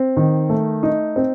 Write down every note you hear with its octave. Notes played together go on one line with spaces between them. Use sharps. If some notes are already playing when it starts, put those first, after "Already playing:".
Already playing: C4
D#3
A3
D#4
C4